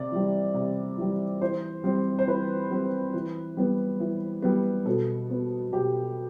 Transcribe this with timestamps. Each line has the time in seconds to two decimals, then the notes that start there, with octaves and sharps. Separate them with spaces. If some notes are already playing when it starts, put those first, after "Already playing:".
Already playing: C3 D5
0.12 E3 G3
0.54 C3
0.98 E3 G3
1.41 E3 C5
1.84 G3 C4
2.19 C5
2.27 E3 B4
2.70 G3 C4
3.14 E3
3.57 G3 B3
4.00 E3
4.42 G3 B3
4.86 B2 A4
5.30 B3
5.72 B2 G4